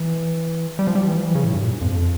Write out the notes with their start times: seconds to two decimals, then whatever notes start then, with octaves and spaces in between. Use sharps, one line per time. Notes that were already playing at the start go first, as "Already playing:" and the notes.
Already playing: E3
0.79 G3
0.87 F3
0.95 G3
1.07 E3
1.16 F3
1.25 E3
1.35 C#3
1.44 A2
1.54 G2
1.63 A#2
1.72 G2
1.81 F2
1.91 F2